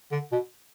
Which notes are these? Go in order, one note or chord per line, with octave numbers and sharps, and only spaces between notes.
D3
B2